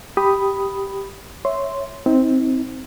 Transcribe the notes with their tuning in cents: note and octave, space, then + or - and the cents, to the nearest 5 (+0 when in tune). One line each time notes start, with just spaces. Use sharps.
G4 +0 B5 +0 D#6 +0
C#5 +0 E5 -5 C6 -5
C4 +0 D#4 +35